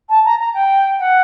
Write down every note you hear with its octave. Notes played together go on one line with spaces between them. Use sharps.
A5
A#5
A#5
G5
F#5